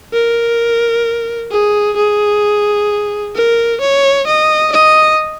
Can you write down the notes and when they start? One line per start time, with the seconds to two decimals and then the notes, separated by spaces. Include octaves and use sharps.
0.13 A#4
1.51 G#4
1.97 G#4
3.35 A#4
3.81 C#5
4.27 D#5
4.72 D#5